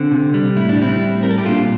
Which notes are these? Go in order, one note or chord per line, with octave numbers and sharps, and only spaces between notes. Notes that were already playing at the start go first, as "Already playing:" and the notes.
Already playing: D3 C4
C3
G3
A2 E4
D4
G3 C4 E4
A2
G3 A#4
A4
G4
A#2 D4 F4